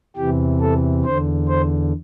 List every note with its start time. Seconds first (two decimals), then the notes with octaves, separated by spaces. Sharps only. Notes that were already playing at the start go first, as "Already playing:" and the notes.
0.17 E2 C3 E3 G4
0.61 A4
1.04 E2 D3 C5
1.48 C5